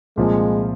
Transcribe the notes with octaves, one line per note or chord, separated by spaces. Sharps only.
C2 A#2 F3 G#3